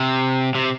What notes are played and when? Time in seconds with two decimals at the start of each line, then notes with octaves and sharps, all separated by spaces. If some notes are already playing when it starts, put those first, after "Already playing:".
Already playing: C3
0.55 C3